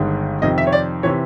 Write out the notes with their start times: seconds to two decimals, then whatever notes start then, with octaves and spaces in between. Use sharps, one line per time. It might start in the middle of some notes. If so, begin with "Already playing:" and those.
Already playing: G1 G2 D#3 G#3
0.42 F2 C3 D#3 D#5
0.58 E5
0.67 C#5
0.73 D5
1.03 C3 E3 C#5